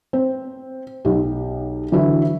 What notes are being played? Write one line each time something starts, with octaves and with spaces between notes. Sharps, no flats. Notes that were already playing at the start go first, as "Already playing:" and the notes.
C4
B1 G4
D3 E3 F#3 E4